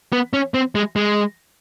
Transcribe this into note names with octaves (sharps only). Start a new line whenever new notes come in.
B3
C#4
C4
G#3
G#3